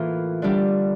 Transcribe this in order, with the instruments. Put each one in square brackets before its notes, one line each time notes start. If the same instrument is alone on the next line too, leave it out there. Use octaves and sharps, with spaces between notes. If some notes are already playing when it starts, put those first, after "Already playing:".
Already playing: [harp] A2 E3 A#3 F4
D3 G3 D4 G4